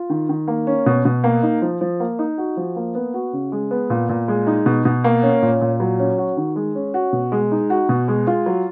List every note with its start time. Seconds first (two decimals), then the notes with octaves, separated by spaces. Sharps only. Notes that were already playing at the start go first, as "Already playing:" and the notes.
Already playing: F4
0.10 D#3
0.29 D#3
0.47 A#3
0.67 C#4
0.86 B2
1.05 B2
1.24 A#3
1.43 D#4
1.62 F3
1.81 F3
2.00 A#3
2.19 D#4
2.38 F#4
2.57 F3
2.76 A#3
2.95 B3
3.14 F#4
3.33 C#3
3.52 G#3
3.71 B3
3.90 A#2
4.09 A#2
4.28 G#3
4.47 D#4
4.66 B2
4.85 B2
5.04 A#3
5.23 C#4
5.42 A#2
5.61 A#2
5.80 F#3
5.99 C#4
6.18 F#4
6.37 D#3
6.56 G#3
6.75 C#4
6.94 F#4
7.13 B2
7.32 G#3
7.52 D#4
7.70 F#4
7.89 B2
8.08 G#3
8.27 F4
8.46 F#3